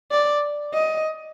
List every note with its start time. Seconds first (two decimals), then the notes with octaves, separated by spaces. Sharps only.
0.11 D5
0.73 D#5